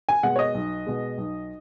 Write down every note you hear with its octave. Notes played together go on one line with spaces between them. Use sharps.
G#5
B2 G#3 F#5
C#5
D#5
B1
B2 G#3
B1